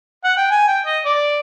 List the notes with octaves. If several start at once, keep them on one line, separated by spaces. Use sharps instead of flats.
F#5
G5
G#5
G5
D#5
D5